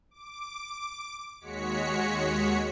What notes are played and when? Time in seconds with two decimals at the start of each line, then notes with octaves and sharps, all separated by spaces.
0.11 D6
1.41 D#2 G#3 F#4 C#5 B6 C#7